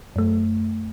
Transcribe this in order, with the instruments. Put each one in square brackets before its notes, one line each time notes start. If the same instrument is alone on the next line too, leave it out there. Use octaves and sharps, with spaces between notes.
[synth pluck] F#2 A3